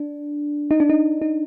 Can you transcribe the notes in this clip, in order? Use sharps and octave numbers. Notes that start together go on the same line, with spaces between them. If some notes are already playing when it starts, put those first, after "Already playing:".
Already playing: D4
D#4
D4
D#4
D#4